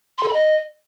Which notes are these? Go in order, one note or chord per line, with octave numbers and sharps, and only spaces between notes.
C6
A4
B5
D#5